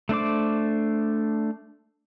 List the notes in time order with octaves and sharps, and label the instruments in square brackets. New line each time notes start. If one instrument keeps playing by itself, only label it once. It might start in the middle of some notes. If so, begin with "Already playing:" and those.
[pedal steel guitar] A3 D4 C5 D6